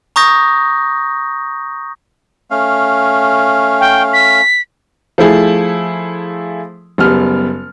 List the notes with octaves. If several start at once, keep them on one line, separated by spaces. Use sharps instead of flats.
A#5 C#6 D#6 G6 A#6
A3 C#4 F5
G5
B6
F3 A3 E4 G#4
F#1 G3 B3 F6